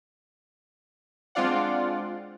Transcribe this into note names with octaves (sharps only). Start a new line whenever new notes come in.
G#3 C4 D4 F4 D5 F#5